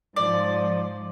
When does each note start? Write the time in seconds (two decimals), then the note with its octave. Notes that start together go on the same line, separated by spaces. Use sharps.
0.16 G#2 F3 D5